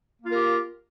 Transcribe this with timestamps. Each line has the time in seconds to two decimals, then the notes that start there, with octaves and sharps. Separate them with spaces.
0.22 A#3
0.26 F4
0.30 A#4
0.34 G4